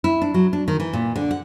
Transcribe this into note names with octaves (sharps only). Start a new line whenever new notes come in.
E4
D4
F#3
D4
D#3
E3
A#2
D3
F#5